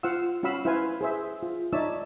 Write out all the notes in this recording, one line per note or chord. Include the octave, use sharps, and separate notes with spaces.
F4 C5 F5 F#5 E6
C#4 F#4 F5 B5 E6
E4 B4 C5 F5 G#5
G#4 C5 E5
F4
D#4 C#5 D5 E5 A5 E6